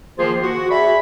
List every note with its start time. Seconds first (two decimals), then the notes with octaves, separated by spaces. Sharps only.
0.19 D#3 F3 A#3 F4 G#4 C5
0.43 F#4
0.71 G#4 D5 E5 B5